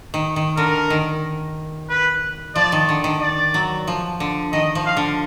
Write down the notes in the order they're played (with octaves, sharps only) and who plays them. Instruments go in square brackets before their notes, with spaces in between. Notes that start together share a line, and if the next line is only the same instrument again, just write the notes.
[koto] D#3
D#3
[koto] D3 [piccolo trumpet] A#4
[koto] D#3
[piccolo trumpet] B4
[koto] F3 [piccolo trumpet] D5
[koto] D#3
D3
D#3
[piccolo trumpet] D5
[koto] F#3
F3
D3
[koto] D#3 [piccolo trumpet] D#5
[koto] F3
[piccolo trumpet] F5
[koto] D3